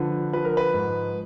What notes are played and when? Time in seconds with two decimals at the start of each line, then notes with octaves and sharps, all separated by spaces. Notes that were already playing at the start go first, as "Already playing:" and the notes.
Already playing: D3 F3 B4
0.33 F3 B4
0.45 A#4
0.57 B4
0.74 G#2